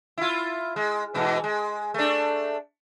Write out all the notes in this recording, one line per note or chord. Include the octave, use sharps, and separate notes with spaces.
E4 F4
G#3
G#2 B2 E3
G#3
A3 D4